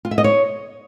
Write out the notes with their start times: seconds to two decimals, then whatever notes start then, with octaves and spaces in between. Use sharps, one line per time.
0.05 F4
0.11 E5
0.18 D#5
0.24 C#5